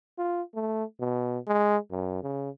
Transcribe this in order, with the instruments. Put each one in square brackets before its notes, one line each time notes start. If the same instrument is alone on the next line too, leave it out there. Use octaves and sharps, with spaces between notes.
[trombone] F4
A3
B2
G#3
F#2
C#3